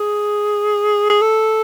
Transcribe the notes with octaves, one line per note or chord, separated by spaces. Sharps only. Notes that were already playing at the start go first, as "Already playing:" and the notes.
Already playing: G#4
G#4
A4